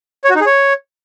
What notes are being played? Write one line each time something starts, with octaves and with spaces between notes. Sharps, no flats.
C#5
F#4
D#4
G#4
C#5